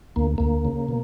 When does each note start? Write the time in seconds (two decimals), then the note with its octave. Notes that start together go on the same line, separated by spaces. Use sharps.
0.16 D2 A#3
0.38 D2 A#3
0.65 C#3
0.88 B2